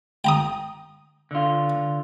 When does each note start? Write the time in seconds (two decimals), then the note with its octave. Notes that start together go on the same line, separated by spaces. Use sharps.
0.24 G5 A#5 D#6
1.31 D3 F4